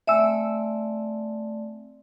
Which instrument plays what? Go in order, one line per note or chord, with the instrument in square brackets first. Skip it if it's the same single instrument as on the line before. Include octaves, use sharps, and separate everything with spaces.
[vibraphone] A3 C4 D5 [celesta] E5 G#5 E6